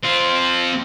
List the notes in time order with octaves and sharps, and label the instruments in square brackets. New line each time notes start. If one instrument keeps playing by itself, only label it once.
[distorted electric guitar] C4 F4